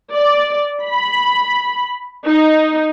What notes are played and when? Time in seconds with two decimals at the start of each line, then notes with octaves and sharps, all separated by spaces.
0.13 D5
0.84 B5
2.26 D#4